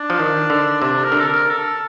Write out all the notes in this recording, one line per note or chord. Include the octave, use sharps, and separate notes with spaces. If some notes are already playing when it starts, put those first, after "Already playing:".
Already playing: D4
F3
D#3
D3
C3 D4
A#4
D3
A4
A#4
A4